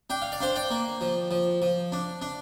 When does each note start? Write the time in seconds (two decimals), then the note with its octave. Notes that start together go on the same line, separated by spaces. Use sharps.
0.10 D4 G5
0.22 F5
0.32 D5
0.41 D4 C5 F5
0.56 D5 G5
0.70 A#3
1.01 F3
1.31 F3
1.62 F3
1.92 D4
2.22 D4